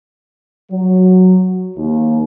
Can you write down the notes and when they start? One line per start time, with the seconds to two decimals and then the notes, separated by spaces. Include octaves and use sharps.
0.72 F#3
1.77 D#2